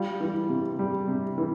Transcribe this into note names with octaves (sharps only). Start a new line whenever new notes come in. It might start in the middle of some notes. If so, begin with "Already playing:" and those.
Already playing: G3 F4
E3
C3
G3
C3
E3